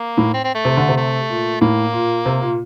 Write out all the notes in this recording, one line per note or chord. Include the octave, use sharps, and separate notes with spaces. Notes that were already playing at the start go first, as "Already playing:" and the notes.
Already playing: A#3
A2
C4
C4
A3
C3
D3
C3
A3
A#2
A2 A#3
A#2
C3
A#2